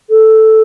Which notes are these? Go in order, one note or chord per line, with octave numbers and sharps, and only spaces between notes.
A4